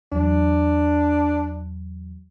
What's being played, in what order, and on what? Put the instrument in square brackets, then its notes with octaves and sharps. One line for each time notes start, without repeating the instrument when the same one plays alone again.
[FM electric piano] E2 F#3 [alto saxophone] D4